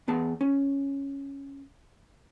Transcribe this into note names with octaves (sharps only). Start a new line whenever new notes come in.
E2 B3 G#4 A5
C#4